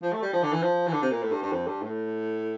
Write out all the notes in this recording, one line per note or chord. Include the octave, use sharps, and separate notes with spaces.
F3
A3
G3
F3
D3
E3
F3
E3
D3
C3
A#2
A2
G2
G2
F2
G2
A2